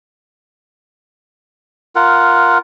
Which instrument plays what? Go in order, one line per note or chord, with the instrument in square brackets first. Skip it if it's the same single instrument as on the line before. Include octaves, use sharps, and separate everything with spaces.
[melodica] F4 A#4 F#5